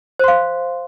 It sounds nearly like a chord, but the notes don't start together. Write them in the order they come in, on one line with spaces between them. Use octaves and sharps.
C5 C6 F5